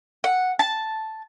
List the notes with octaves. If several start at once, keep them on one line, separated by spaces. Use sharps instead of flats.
F#5
A5